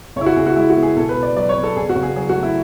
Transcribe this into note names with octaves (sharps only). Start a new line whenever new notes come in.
C#3 C#5
E4
F#4
C#3 G#4
F#4
G#3 E4
F#4
B3
G#4
B2 A4
B4
B2
D5
F#3 D5
C#5
B3
A4
C#3 G#4
F#4
C#3
G#4
F#3 G#4
F#4
A3
E4